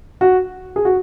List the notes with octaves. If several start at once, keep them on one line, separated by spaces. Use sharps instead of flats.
F#4
G#4
F#4